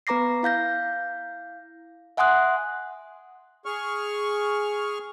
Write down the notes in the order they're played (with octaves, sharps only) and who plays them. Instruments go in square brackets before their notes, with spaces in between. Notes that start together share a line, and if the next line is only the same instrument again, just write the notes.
[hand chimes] B3 B4 A#5 D6 A#6 C7
E4 F5 G6 A#6
E5 F#5 G#5 C6 D#6 F#6
[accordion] G#4 C#6 F6